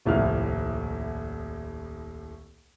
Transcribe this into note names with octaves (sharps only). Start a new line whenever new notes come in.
D#1 C2 A2 F3 F6